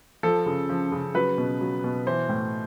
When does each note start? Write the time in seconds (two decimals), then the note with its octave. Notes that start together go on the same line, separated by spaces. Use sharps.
0.23 F3 A4
0.46 C#3
0.69 F3
0.92 C#3
1.15 F#3 B4
1.38 B2
1.61 F#3
1.84 B2
2.07 E3 C5
2.29 A2